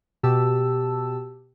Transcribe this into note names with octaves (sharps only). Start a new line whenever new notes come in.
B2 G4 A5 E6